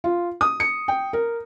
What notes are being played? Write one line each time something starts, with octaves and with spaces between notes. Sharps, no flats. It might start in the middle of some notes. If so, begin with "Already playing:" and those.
F4
D#6
C#7
G5
A#4